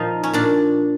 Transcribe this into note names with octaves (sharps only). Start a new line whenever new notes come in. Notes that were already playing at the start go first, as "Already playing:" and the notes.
Already playing: A#2 F3 D#4
C#4
A#2 D4